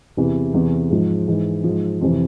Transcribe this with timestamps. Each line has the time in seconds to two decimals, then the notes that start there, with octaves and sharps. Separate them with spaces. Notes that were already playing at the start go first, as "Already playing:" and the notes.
0.17 E2 C3 E3
0.54 E2 C3 E3
0.90 G#2 F3
1.28 G#2 E3
1.64 G#2 F3
2.01 F2 C3 E3